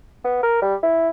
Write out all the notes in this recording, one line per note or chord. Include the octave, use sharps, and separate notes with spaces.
B3
A#4
G3
E4